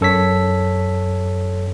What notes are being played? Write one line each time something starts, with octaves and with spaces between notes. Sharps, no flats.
F#2 A4 C#5 B6